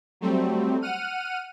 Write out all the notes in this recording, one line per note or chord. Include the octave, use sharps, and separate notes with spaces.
F#3 G3 A3 C4
F#5 F6 D#7